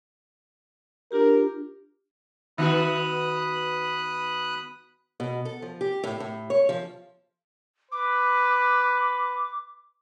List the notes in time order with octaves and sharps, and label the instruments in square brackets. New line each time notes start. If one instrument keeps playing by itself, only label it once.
[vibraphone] D4 F4 G4 [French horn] A#4
[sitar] D#3 B3 F#4 [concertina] B5 D#6 F#6
[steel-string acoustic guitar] B2
A4
F3
G4
A2
A2
C#5
F3
[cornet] B4 [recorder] D6